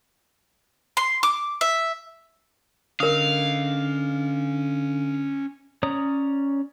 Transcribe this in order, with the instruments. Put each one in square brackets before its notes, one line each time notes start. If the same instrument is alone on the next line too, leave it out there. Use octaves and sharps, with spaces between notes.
[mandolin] C6
D6
E5
[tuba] D3 [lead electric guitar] C#4 D#5 [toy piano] A#4 D#6 [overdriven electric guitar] F5
[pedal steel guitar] C#4 C#5 D5 A#5 D#6